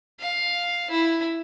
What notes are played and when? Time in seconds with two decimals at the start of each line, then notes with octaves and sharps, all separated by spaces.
0.21 F5
0.91 E4